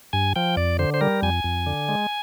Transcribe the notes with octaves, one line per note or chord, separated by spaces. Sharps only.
G2 G#5
F3 G5
F2 D5
D3 C5
C5
G3 A#4
F2 G#5
F2
D3
G#3